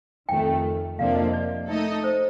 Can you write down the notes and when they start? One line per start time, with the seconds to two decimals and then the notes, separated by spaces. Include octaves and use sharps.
0.28 F2 D#3 A3 G5
0.99 F2 C3 F3 A#3 D4 F5
1.16 D#5
1.33 D5
1.69 A3 D#4 A4 D#5
2.04 C5